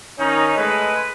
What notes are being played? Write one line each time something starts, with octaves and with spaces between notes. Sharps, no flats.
D#3 C#4 D#4
G#3 A3 B4